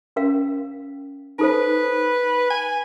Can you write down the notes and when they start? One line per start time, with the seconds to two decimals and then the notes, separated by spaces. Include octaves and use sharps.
0.16 C#4 A#4 F5
1.39 D#4 A4 B4 C5
2.50 G#5